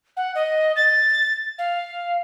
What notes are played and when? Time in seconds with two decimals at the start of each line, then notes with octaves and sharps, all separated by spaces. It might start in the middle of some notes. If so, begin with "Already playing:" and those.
0.17 F#5
0.35 D#5
0.76 A6
1.58 F5